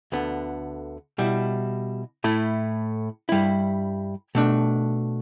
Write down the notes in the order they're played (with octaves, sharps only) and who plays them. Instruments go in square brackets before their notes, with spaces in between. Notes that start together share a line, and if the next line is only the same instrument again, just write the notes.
[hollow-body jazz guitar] D2 D3 B3
B2 G3 E4
A2 A3 E4
G2 G3 E4
B2 A3 D4